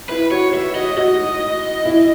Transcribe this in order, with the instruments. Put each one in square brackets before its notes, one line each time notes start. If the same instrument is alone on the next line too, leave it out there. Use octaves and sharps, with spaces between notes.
[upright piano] E4 [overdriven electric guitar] B4
[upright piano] F#4 [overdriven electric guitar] C#5
[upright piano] F#4 [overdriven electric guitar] E5
[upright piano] F#4 [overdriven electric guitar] D#5
[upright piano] F#4 [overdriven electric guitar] D#5
[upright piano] E4